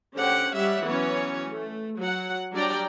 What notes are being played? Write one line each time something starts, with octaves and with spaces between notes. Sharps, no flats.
D3 C#4 G4 C5 F#5 G5
G3 G4 C#5 E5 F#5
E3 F#3 B3 C#4 C#5
A3
F#3 F#5
F#3 G3 D4 D5 G5 A#5